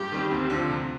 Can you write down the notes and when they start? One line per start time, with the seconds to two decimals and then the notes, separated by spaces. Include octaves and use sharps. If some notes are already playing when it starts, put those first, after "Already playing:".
Already playing: G2 G4
0.12 D#3 G3 C4
0.31 D2 C4
0.50 D3 F3
0.69 C3